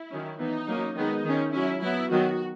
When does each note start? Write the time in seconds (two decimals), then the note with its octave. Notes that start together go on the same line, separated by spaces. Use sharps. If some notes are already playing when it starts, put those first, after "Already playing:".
Already playing: E4
0.11 D#3 F#3 C#4
0.39 E3 B3 D#4
0.68 F#3 A#3 C#4
0.96 D#3 G#3 B3 D#4
1.25 D#3 G#3 C#4
1.53 F#3 C#4 E4
1.82 F#3 B3 E4
2.11 D#3 F#3 B3 F#4